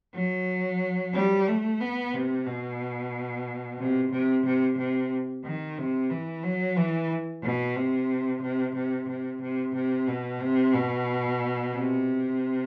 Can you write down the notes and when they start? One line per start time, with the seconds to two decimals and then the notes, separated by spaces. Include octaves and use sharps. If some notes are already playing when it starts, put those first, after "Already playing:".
0.15 F#3
1.14 G3
1.48 A3
1.80 B3
2.14 C3
2.47 B2
3.79 C3
4.12 C3
4.46 C3
4.78 C3
5.45 D#3
5.78 C3
6.10 E3
6.44 F#3
6.77 E3
7.43 B2
7.76 C3
8.42 C3
8.75 C3
9.09 C3
9.42 C3
9.75 C3
10.08 B2
10.41 C3
10.74 B2
11.73 C3